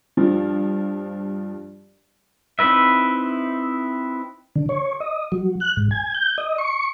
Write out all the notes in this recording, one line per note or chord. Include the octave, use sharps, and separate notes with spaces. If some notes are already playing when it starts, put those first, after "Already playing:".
G2 F3
C4 D#4 E4 B4 E5
D3
C#5
D#5
F#3
F#6
G#2
G#5
G6
D#5
C#6